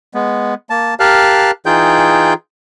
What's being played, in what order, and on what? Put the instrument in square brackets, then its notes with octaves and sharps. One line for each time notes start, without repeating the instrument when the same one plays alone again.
[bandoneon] G#3 B3
A#3 A5
G4 A#4 F5 A5 F6 F#6
E3 D#4 F4 G#4 G5 G6